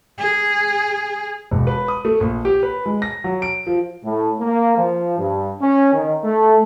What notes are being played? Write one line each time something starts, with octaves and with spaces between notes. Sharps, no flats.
G#4
E1
B4
D#6
A3
A#1
G4
B4
G#3
A#6
F#3
D7
F3
A2
A#3
F3
G2
C#4
D#3
A3